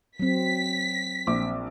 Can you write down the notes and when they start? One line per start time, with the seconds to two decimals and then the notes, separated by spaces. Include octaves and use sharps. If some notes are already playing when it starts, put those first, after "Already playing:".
0.19 F#3 C4 B6
1.27 A#1 C4 D6